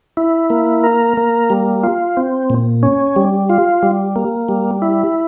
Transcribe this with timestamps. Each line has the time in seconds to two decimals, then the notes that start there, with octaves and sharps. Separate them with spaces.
0.17 E4
0.50 A#3
0.84 A#4
1.17 A#3
1.50 G3
1.83 F4
2.17 C4
2.50 A#2
2.83 C#4
3.16 G3
3.50 F4
3.83 G3
4.16 A#3
4.49 G3
4.82 E4